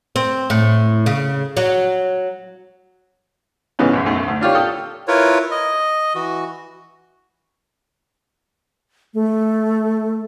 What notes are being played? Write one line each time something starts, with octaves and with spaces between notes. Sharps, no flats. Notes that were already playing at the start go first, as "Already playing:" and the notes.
C4
A2
C#3
F#3
G#2 C#3 E3 B3 C#4
B1 F#2
B1 F#2 A3
D2
D4 F4 G4 C#5
A4 G5 D#6
E4 F4 A#4 B4 C#5
D#5
E3 F#4
A3